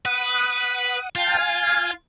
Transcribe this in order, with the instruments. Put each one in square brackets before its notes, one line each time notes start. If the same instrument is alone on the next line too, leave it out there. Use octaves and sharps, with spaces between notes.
[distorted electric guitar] B4 [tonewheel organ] F#5 D#6
[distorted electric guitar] F4 [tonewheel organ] F5 G5 A5
[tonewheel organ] F5 G#5